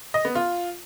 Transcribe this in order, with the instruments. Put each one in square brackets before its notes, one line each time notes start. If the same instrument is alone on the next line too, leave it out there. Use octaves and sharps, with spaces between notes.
[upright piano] D#5
B3
F4